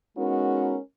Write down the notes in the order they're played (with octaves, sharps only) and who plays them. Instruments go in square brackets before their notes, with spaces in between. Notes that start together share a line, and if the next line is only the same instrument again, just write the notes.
[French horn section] G#3 B3 C#4 D#4 F#4 A#4